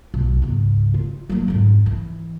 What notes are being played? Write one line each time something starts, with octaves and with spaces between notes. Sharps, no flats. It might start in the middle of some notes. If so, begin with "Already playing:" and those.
B1
C#2 G#2
F4
F#3 A#3
F2 G#2
E3